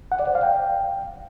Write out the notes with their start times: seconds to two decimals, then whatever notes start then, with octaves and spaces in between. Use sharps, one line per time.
0.12 F#5
0.19 D5
0.27 C5
0.35 F5
0.43 G5